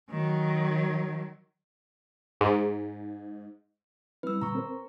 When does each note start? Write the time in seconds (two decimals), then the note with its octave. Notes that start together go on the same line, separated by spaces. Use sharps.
0.10 D#3 F#3
2.41 G#2
4.23 G3 C4 E4 B4 E6
4.42 A#2 D3 G3 A#5 C#6
4.55 C4 A#4 C5